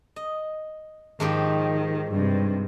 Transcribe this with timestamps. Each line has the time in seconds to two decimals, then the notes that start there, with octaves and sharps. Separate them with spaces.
0.16 D#5
1.20 G#2 D#3 F3 G4
2.12 G2 C3